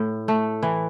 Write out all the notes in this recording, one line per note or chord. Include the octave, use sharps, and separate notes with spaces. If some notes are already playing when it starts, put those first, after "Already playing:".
Already playing: A2
A3
E3